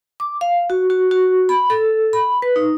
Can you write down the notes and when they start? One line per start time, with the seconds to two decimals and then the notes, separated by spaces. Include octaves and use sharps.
0.20 D6
0.41 F5
0.70 F#4
0.90 F#4
1.11 F#4
1.49 B5
1.70 A4
2.13 B5
2.42 B4
2.56 D#4